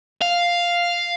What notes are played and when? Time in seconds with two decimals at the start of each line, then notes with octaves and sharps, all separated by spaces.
0.22 F5